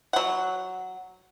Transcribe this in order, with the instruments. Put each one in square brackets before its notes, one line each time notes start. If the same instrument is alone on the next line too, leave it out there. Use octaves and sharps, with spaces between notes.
[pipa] F#3 F#5